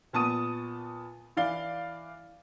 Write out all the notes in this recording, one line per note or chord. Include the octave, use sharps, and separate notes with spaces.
A#2 B3 A5 C#6 D#6 D#7
E3 D5 F5 G7